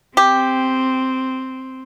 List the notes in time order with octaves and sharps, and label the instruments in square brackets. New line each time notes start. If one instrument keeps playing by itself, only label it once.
[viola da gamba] C4 [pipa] G4